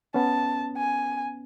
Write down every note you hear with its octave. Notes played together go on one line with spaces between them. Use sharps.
B3 C#4 A5
G#5